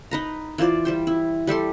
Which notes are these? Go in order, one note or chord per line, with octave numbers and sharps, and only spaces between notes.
D#4 B4 A#5
E3 F4 C5 D5
G3 C5 G5
E4
G3 G4 A4 C6